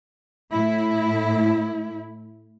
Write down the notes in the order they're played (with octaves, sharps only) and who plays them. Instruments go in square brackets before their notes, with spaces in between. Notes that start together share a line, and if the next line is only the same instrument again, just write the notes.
[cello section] A2 E4